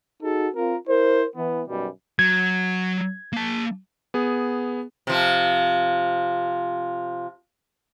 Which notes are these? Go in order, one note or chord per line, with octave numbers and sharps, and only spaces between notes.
D#4 F#4 G#4 A4
C4 F4 A#4
E4 A#4 C5
E3 B3
B1 F#2 B2 G3
F#3 G#6
A#3 A5
B3 G#4
C3 F3